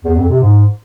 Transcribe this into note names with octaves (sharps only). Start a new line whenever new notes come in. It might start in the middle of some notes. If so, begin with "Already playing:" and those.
E2
F2
C3
G#2